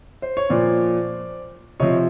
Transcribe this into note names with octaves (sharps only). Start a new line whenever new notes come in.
C5
C#5
A#2 F3 C5 D5
C3 F3 C#5 D#5